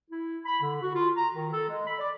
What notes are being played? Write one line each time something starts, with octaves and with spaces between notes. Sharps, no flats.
E4
B5
D3
F#4
F4
A#5
D#3
A4
G#3
B5
D5